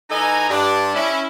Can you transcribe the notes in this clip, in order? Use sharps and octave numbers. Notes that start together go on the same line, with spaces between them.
E3 D#4 A4 D#5 G#5 A#5
G2 D4
C#4 E4